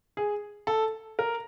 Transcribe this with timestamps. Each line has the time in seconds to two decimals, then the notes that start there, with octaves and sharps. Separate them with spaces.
0.17 G#4
0.67 A4
1.19 A#4